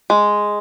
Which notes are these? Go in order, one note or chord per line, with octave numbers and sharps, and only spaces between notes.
G#3